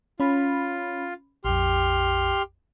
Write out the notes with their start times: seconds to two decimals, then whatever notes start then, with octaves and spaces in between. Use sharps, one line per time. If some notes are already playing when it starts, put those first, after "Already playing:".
0.20 C#4 F4 B5
1.45 A#1 F2 G4 C6 F6